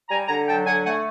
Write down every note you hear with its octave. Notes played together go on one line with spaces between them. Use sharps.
G3 G#5 A#5
D3 G#5 A#5
F#3 G5 A5
D3 F#5 G#5
A3 F#5 G#5